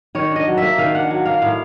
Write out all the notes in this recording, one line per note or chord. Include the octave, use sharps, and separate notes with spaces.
D#3 C#5
D4 D#5
F#3
A#3 E5
D#3 F5
D4 F#5
F#3
A#3 F5
A2 F5